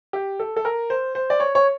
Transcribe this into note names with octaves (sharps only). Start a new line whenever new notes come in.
G4
A4
A4
A#4
C5
C5
D5
C#5
C#5